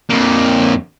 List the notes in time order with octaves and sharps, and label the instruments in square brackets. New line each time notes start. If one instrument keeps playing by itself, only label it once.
[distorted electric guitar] F2 A#3